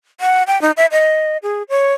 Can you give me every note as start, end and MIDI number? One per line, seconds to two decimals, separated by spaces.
0.20 0.43 78
0.47 0.60 79
0.62 0.71 63
0.77 0.86 76
0.92 1.37 75
1.43 1.63 68
1.69 1.93 73